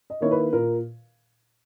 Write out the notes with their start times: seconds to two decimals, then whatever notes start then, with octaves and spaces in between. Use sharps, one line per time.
0.10 D#5
0.21 D#3 A#3 E4 C#5
0.31 B4
0.53 A#2 A#4